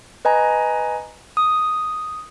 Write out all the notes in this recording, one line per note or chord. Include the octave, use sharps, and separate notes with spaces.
B4 D#5 G#5 A#5
D#6